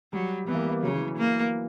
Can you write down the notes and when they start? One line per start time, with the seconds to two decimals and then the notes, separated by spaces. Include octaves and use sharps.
0.13 F#3 G3
0.48 E3 B3
0.55 A#3
0.63 G3
0.69 A#3
0.83 C#3 F#3
0.94 E3
1.18 A#3